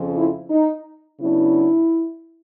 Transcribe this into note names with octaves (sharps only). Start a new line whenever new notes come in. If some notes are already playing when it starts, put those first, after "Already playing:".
Already playing: F2 C#3 F3
E4
D#4
C#3 F#3 B3 D4 E4